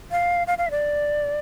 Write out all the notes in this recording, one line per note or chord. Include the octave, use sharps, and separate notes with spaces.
F5
F5
F5
E5
D5